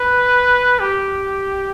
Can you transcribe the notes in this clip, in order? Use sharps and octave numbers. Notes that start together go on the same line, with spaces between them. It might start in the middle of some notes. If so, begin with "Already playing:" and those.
Already playing: B4
G4